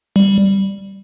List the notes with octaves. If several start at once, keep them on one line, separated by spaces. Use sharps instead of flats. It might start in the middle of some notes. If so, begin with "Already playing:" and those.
G3